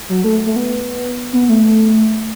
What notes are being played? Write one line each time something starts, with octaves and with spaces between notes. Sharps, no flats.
F#3
A3
A3
B3
B3
A3